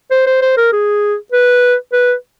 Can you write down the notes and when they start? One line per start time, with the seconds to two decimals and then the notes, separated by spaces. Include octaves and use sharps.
0.11 C5
0.27 C5
0.41 C5
0.57 A#4
0.72 G#4
1.32 B4
1.92 B4